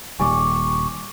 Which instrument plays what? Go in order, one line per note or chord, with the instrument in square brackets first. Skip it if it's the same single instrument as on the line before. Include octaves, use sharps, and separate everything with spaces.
[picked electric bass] D#1 D#2 G3 [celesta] G#5 D6 [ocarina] C#6